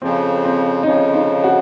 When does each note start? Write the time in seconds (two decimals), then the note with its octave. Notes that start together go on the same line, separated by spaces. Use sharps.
0.02 F2 C#3 F3 C4
0.45 C4
0.83 D#4
0.86 F2 C#3 F3 C#4
1.15 D#4
1.44 F#4